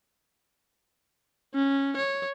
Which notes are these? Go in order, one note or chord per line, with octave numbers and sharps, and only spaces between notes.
C#4
C#5